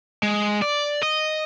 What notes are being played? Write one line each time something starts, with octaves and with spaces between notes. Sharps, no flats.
G#3
D5
D#5